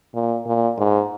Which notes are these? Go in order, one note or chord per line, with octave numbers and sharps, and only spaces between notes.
A#2
A#2
G#2